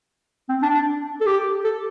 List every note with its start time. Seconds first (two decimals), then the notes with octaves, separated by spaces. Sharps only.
0.49 C4
0.63 D4
0.75 D4
1.21 A4
1.26 G4
1.64 A4